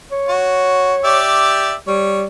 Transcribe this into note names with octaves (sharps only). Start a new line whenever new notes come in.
C#5
F#4
G4 D5 E5
G3 C#5